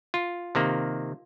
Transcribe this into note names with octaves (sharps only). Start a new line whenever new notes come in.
F4
C3 D#3 A#3